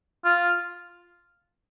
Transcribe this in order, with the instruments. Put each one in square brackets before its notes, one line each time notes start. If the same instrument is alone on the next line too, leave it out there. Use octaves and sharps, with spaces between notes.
[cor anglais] F4